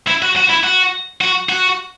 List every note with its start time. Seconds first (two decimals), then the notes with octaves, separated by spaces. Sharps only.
0.07 E4
0.22 F#4
0.36 F#4
0.50 E4
0.63 F#4
1.21 F#4
1.49 F#4